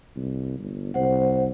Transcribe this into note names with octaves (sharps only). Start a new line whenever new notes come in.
C2
G1
C2 C5 F#5